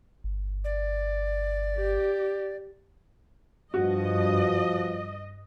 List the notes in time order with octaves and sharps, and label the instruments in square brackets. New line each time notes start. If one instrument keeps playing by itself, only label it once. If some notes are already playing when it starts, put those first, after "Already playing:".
[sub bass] G1
[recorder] D5
[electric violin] G4
[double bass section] G2 [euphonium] F3 [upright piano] F#4 [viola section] D#5